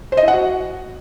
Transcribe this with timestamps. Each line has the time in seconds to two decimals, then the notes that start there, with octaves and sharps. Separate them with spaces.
0.12 C5
0.17 D#5
0.23 E4
0.28 F#5
0.33 F#4